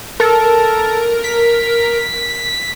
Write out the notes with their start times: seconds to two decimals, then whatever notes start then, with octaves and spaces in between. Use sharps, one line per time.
0.20 A4 A#4
1.24 B6